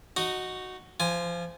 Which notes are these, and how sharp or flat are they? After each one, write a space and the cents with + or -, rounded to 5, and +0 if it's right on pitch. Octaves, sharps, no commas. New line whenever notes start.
D#4 -10 F#4 +0
F3 -20 G#5 +0